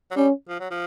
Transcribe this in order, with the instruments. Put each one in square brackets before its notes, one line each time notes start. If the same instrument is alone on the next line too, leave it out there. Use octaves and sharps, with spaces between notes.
[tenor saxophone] F#3
[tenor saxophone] G3 [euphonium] C#4
[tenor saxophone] F3
F#3
F3